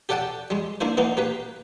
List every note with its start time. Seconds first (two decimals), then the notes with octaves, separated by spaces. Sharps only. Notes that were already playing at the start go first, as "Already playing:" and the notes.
0.09 G4 A4 D5 F#5 G5 A5
0.50 G3 G#3
0.81 A#3 D4 E4 C5
0.97 E3 A#3 B3 D#4
1.17 A#3 G4 B4